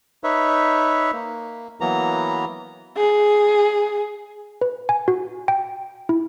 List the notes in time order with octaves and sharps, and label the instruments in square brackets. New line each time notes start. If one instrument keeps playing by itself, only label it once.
[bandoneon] D#4 B4 C#5 E5
A#3
E3 F#3 A#3 B3 A#5
[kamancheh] G#4
[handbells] B4
G#5
F#4
G5
E4